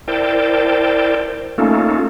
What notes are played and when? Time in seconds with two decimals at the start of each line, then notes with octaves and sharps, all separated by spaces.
0.08 E4 A#4 C5 D5 G5 A5
1.58 A3 A#3 C#4 D#4 F4 A4